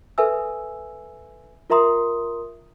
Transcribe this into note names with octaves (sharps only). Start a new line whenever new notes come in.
A4 B4 E5 G#5 E6
F4 A#4 E5 A#5 C6 D#6